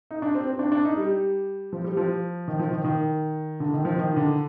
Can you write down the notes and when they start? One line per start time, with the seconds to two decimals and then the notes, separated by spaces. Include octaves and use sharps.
0.11 D#4
0.22 D4
0.35 C4
0.47 C4
0.59 D4
0.72 D4
0.85 D#4
0.97 G3
1.73 F3
1.84 G3
1.97 F3
2.48 D#3
2.59 F3
2.72 D#3
2.84 D#3
3.60 D3
3.73 D#3
3.85 F3
3.98 D#3
4.16 D3